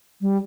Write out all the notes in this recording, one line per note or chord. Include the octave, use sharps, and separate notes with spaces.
G3